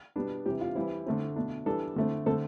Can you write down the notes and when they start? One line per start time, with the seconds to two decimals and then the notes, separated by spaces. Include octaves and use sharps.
0.16 B2 G3 B3 D4
0.46 C3 E3 G3 G4
0.61 F4
0.75 E3 G3 C4 E4
1.06 D3 A3 C4
1.36 B2 A3 D4
1.66 E3 G3 D4 A4
1.96 D3 A3 C4
2.26 D3 A3 C4 A4